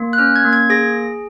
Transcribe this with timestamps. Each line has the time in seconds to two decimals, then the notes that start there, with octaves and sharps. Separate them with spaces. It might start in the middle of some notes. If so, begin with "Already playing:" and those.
Already playing: A#3
0.13 F#6
0.18 C#4 F6
0.36 G#6
0.45 A#3
0.53 G#6
0.70 G#4 A#6